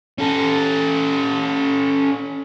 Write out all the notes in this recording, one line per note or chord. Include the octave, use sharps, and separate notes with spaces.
C#4 A4